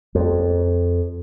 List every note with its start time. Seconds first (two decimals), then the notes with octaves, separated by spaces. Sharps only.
0.15 F2